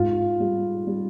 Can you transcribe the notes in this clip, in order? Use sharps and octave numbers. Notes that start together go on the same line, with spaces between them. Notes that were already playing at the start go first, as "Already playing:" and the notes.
Already playing: G#2 F4
G3
G3